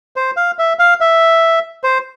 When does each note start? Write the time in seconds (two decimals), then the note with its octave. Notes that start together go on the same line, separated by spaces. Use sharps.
0.16 C5
0.37 F5
0.59 E5
0.79 F5
1.01 E5
1.84 C5